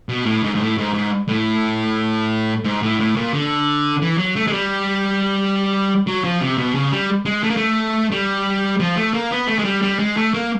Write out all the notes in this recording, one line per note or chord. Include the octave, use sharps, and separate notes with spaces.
B2
A2
G#2
G#2
A2
G#2
G#2
A2
G#2
A2
A2
A#2
D3
E3
F#3
A3
G#3
G3
F#3
F3
C3
B2
C#3
G3
G#3
A3
A#3
A3
G3
F3
A3
A#3
B3
A3
G#3
G3
G3
G#3
A3
A#3